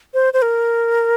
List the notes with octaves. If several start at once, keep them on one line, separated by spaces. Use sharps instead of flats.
C5
C5
A#4